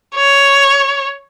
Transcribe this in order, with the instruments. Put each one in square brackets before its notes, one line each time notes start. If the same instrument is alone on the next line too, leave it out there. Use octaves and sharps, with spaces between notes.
[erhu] C#5